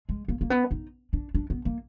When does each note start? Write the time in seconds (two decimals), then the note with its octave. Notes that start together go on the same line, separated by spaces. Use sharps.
0.09 G#3
0.28 A#3
0.41 A#3
0.50 B3
0.71 D#4
1.13 D4
1.35 D4
1.50 B3
1.65 A#3